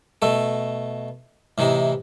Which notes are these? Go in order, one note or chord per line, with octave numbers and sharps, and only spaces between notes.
B2 A3 A4
A2 C3 E3 D#4